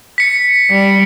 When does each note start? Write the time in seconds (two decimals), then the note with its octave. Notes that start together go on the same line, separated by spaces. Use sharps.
0.18 B6 C#7
0.71 G3